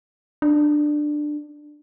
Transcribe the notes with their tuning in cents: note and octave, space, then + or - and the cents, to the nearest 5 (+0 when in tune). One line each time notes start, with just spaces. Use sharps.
D4 +15